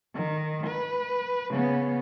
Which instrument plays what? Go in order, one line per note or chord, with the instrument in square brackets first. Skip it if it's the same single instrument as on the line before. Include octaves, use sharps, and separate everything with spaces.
[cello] D#3
B4
C#3 B3